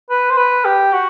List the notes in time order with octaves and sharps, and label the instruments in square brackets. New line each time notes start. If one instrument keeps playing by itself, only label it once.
[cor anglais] B4
C5
B4
G4
F#4